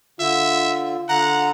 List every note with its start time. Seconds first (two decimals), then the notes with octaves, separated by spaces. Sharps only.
0.20 D3 F4 E5
1.09 D3 F#5 A#5